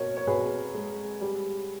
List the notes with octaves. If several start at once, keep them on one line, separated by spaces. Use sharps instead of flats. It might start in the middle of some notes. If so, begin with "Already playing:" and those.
Already playing: B2 A#4 C#5
C#5
B2 G#4 B4
G#3
G3